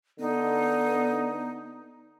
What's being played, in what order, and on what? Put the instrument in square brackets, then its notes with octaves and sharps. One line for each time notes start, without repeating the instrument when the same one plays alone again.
[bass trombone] D3 [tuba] B3 [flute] D#4